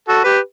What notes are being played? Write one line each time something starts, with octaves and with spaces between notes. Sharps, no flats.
F#4 A4
G4 B4